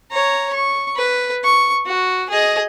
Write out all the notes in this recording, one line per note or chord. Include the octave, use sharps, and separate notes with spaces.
C#5 A#5
C#6
B4
C#6
F#4
G#4 D#5